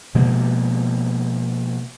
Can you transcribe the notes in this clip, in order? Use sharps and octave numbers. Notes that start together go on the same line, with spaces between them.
B2 F3 G#3 A#3